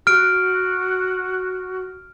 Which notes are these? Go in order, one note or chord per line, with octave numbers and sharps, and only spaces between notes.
F#4 F6 D7